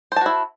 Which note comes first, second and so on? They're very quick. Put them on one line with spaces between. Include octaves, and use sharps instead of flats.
C5 A5 F#4 E4